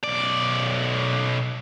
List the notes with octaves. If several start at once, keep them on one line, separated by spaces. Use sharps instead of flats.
B1 D5